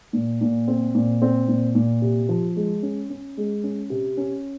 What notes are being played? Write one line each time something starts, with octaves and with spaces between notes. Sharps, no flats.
A#2
A#2
C4
A#2
C4
A#2
A#2
C3
F3
G#3
C#4
C#4
G#3
C#4
C3
C#4